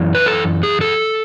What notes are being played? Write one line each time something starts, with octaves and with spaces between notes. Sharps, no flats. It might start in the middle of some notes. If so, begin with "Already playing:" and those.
Already playing: F#2 E3
B4
A4
G#4
A4